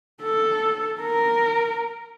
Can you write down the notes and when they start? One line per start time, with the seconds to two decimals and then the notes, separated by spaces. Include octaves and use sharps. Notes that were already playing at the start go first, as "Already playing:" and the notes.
0.23 A4
1.00 A#4